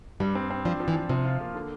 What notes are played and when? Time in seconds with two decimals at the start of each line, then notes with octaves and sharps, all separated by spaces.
0.20 G2 G3
0.35 C4
0.50 C4
0.65 F3 D4
0.80 F3
0.88 E3
0.95 F3
1.09 C3 F3
1.25 F4
1.40 A#3
1.55 D3